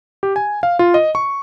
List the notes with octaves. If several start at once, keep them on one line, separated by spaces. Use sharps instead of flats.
G4
G#5
F5
F4
D#5
C#6